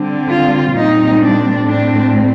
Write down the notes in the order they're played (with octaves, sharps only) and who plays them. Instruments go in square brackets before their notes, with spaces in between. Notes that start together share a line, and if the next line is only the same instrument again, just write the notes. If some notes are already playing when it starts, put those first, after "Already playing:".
Already playing: [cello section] D3 G3 C4
F4
A#2 G3 C4 D#4
D4
A2 A3 C4 D4